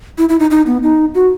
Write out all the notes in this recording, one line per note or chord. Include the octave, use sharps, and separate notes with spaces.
E4
E4
D#4
D#4
B3
D#4
F#4